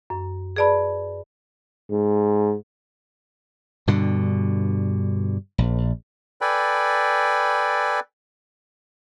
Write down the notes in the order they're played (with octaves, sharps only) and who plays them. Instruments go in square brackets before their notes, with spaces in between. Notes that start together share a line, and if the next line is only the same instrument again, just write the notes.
[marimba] F#2
G#4 B4 D5 A5 B5
[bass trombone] G#2
[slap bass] G2 B2 D3
A#1
[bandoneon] A4 B4 D5 G5 G#5 B5